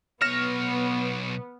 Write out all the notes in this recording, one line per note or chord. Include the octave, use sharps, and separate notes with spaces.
B1 B3 C#5 F6 A#6 E7